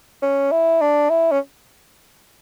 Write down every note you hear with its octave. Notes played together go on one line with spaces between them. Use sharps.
C#4
E4
D4
E4
C#4